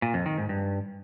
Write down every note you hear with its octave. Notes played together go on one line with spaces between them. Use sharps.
A#2
F2
D#3
G#2
G2